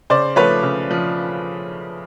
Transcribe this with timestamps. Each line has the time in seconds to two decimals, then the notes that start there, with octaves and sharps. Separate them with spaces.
0.10 C#3 C5 D5
0.36 F3 A3 B4 C#5
0.63 C#3
0.91 F3